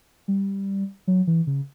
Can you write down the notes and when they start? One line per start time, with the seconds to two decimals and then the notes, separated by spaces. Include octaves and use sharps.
0.28 G3
1.07 F#3
1.27 E3
1.47 C#3